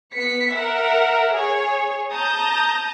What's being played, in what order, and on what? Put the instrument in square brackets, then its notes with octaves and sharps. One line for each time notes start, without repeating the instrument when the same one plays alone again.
[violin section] B3 B6 C#7
A#4 E5 F#5
G#4 C#5
A5 A#5 D#6 G6